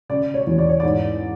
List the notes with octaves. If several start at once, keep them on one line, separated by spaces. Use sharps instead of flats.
C#3 D5
C#5
E2
D5
C#5
G#2 D5